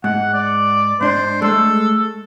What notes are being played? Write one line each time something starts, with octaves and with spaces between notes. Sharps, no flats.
G#2 F#5
D5
G#2 D4 C5
G#3 A3 A4